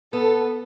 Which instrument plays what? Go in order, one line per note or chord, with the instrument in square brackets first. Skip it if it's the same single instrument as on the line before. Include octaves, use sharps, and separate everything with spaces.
[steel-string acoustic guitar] B3 [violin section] A4